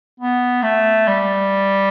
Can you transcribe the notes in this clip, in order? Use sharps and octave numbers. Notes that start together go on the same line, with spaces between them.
B3
A3
G3